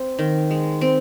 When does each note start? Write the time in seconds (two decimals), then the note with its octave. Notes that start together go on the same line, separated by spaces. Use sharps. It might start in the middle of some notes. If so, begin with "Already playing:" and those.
Already playing: C4
0.19 D#3
0.51 G#3
0.81 C4